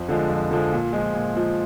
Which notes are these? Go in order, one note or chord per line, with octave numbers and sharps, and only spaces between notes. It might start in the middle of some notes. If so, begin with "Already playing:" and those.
Already playing: F2
D3 F3 G#3
F2
D3 F3 G#3
A#2
F3 G#3
A#2
F3 G#3